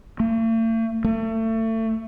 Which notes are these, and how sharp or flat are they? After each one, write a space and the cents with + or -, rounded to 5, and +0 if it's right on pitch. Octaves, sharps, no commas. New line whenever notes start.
A3 +45
A3 +30